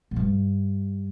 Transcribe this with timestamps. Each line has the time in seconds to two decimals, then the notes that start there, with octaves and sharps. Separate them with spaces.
0.11 G#2
0.16 G2